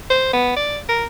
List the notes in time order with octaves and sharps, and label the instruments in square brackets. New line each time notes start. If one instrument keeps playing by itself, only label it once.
[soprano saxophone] C5
B3
D5
A#4